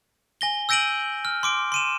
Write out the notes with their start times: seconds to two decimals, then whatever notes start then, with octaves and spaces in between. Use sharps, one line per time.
0.41 G#5 A#6 G7
0.69 E6 G6 A#6 D7 D#7 F#7
1.25 F6
1.43 C6 D6 D7
1.72 C6 D#7 E7